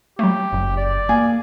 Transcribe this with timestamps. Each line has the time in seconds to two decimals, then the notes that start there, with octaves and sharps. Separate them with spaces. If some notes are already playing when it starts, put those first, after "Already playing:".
0.19 F#3 A3 G4
0.53 F#1
0.77 D5
1.09 A#3 G#4